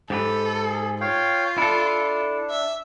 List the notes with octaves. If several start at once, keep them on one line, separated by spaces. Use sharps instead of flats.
G#2 G4 A4 B4
G#4
F4 C#5 F5 G5
D4 E4 A4
E5